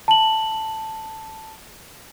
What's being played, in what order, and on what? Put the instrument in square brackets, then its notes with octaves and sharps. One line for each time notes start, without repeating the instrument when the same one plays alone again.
[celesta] A5 F#7